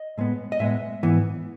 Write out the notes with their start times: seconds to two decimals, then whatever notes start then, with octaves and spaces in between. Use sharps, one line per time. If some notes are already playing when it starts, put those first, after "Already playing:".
Already playing: D#5
0.18 A2 G#3 B3
0.52 D#5
0.59 A2 G#3 B3 E5
1.03 G#2 E3 B3